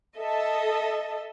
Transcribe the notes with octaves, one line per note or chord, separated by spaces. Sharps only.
A4 D#5 E5 A5